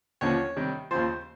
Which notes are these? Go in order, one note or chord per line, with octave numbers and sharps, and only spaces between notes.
D#2 D3 F3 A#3 C#4 C#5
C3 D#3 G3
D#2 C#3 F3 C5